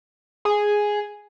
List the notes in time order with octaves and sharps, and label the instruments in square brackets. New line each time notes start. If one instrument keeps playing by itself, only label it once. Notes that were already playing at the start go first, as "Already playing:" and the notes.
[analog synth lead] G#4